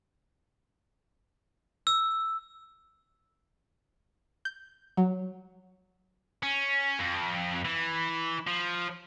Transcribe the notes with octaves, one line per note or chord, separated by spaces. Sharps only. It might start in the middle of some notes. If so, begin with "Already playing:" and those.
E6
G6
F#3
C#4
F2
E3
F3